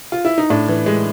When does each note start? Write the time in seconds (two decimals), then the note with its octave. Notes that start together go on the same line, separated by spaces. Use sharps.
0.12 F4
0.25 E4
0.38 D#4
0.50 A2 D4
0.68 E3
0.86 G#3